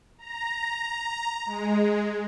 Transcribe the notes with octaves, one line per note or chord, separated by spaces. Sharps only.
A#5
G#3